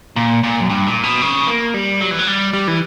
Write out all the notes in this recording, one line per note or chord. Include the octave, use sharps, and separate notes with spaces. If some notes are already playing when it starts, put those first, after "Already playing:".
A#2
A#2
F#2
G2
A#2
B2
C#3
A#3
G3
F#3
E3
F#3
G3
G3
E3